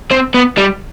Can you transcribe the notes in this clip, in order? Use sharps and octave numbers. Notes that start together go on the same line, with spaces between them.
C4
B3
G3